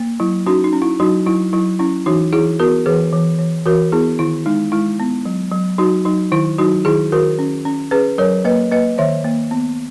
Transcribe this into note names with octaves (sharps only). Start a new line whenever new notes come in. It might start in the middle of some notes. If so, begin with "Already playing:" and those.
Already playing: A#3
F#3 E4
C#4 D#4 F#4
D#4
C#4
E4
F#3 D#4 F#4
F#3 E4
F#3 E4
C#4 E4
E3 D#4 F#4
E3 E4 G#4
B3 F#4 A#4
E3 G#4 B4
E3
E3
E3 F#4 A#4
B3 E4 G#4
D#3 E4
G#3 D#4
G#3 E4
B3
F#3
F#3
F#3 D#4 F#4
F#3 D#4
D#3 E4
F#3 D#4 F#4
D#3 E4 G#4
D#3 F#4 A#4
C#4
C#4
C#4 G#4 B4
F#3 A#4 C#5
A#3 B4 D#5
A#3 B4 D#5
D#3 C#5 E5
A#3
B3